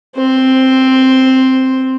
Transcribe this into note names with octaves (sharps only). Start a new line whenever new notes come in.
C4 C5